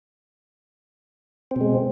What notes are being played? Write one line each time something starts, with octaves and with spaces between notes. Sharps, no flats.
B2 G#3 C4